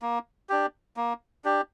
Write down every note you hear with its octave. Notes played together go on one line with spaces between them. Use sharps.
A#3
D4 G4
A#3
D4 G4